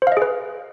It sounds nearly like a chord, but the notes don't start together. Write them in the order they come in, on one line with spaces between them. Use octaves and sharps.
C5 F5 D#5 G#4 B4